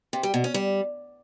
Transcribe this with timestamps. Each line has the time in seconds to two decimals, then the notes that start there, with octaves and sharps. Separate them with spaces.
0.13 C3
0.23 G3
0.34 B2
0.44 C#4
0.54 G3